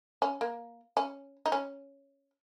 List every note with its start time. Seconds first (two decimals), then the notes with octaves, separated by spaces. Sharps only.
0.22 C#4
0.41 A#3
0.97 C#4
1.46 D#4
1.52 C#4